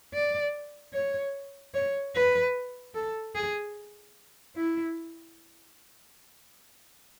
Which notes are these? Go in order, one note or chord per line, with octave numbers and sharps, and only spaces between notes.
D5
C#5
C#5
B4
A4
G#4
E4